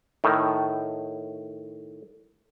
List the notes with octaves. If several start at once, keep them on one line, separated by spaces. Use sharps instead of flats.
A2 D#3